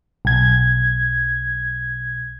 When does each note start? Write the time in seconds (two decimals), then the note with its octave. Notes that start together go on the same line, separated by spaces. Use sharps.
0.25 B1 G#6